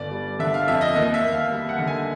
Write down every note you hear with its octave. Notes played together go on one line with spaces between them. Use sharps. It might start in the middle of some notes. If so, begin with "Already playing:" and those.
Already playing: G1 D5
G3
D3 E5
F5
F2 E5
D#5
D#2 D#5
E5
D#2
F5
G3
F#5
D3
G#5